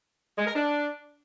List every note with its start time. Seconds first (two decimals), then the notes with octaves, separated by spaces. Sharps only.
0.38 G#3
0.47 A#4
0.55 D4